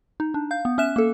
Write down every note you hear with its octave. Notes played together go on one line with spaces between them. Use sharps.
D#4
D4
F5 G6
B3
C#4 E5 F#6 E7
A#3 A4